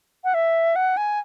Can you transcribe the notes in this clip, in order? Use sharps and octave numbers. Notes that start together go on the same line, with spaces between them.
F#5
E5
F#5
G#5